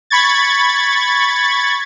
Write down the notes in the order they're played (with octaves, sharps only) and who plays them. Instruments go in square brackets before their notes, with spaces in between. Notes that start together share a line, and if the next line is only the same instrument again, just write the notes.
[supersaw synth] B5 C#6 G#6 A6